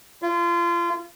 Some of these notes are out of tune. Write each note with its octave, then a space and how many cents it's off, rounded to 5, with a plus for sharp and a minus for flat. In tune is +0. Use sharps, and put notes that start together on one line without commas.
F4 -30